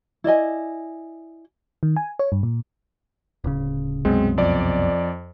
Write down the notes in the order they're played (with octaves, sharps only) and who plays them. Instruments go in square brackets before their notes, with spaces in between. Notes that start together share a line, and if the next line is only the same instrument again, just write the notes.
[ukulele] E4 D5 D#5 G#5
[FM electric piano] D#3
G#5
C#5
G2
A#2
[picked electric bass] D1 C#3
[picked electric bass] C2 F#2 B2 [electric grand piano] G#3 C4
[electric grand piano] F2 D5